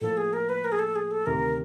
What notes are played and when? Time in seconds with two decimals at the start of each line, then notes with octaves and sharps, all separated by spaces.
0.01 A2 F3 A#3 A4
0.17 G#4
0.33 A#4
0.49 B4
0.65 A#4
0.72 G#4
0.79 A4
0.96 G#4
1.11 A4
1.26 D2 C3 D#3 A#4